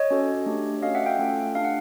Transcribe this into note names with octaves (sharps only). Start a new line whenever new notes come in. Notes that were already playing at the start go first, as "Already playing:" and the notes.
Already playing: C#5 D#5
C#4 F#4 A4
A3 D4 G4
C#4 F#4 A4 D#5 F5
E5 F#5
F5 G5
A3 C#4 F4 A4
D4 G4 F5
F#5